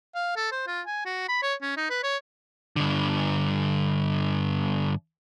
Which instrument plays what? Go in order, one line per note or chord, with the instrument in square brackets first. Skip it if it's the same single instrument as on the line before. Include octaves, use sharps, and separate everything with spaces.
[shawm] F5
A4
C5
F4
G#5
F#4
B5
C#5
C#4
D#4
B4
C#5
[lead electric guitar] G2 D3